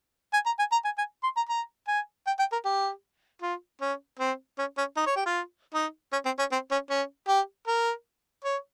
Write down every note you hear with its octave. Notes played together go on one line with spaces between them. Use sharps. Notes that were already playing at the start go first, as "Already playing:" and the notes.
G#5
A#5
G#5
A#5
G#5
G#5
C6
A#5
A#5
G#5
G5
G5
A#4
G4
F4
C#4
C4
C#4
C#4
D#4
C#5
G4
F4
D#4
C#4
C4
C#4
C4
C#4
C#4
G4
A#4
C#5